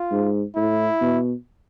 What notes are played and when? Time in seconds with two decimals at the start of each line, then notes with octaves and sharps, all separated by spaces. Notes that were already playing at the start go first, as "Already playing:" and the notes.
Already playing: F4
0.11 G#2
0.56 A2 E4
1.01 B2